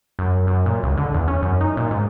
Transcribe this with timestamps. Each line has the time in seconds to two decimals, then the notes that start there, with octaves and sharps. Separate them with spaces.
0.19 F#2
0.47 F#2
0.66 A#2
0.83 C#2
0.97 D3
1.14 E2
1.28 C#4
1.42 F#2
1.61 D#4
1.77 A#2
1.91 G#2